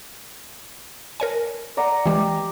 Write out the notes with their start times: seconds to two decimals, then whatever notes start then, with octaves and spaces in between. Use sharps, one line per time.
1.20 A#4 C#5 G#5
1.77 D5 F#5 A#5
2.06 E3 G#3 G4